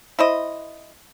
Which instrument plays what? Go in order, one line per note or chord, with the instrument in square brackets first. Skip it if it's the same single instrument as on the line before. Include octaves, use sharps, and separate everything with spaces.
[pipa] E4 C5 D#5